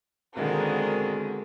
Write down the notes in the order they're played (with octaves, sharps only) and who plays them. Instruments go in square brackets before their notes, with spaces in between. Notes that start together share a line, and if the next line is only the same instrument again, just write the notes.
[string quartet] B2 D3 D#3 G#3 A#3 C4